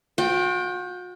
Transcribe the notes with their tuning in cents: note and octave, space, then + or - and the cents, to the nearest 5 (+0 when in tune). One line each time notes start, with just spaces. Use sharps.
F#4 -45 G5 +0